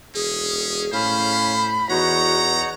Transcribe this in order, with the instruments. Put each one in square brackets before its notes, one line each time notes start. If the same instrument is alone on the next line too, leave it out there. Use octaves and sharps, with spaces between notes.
[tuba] E1 [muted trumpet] C#4 [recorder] G#4
[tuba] A2 [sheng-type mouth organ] C#4 F5 [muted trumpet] C5 [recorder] B5
[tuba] E2 [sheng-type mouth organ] D#4 C#5 F#5 [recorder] F#4 [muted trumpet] A#5